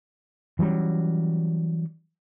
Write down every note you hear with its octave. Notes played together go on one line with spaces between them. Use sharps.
E3 F#3 G3 C#4